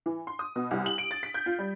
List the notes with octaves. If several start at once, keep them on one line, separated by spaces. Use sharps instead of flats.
E3
C6
D#6
B2
C2
F#7
D7
A6
B6
G6
F4
G3